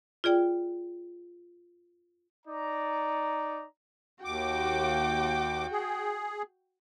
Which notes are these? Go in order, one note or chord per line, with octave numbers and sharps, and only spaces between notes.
F4 G#4 D5 G5
D#4 D5 A#5
D#2 F#4 G5 D6
G#4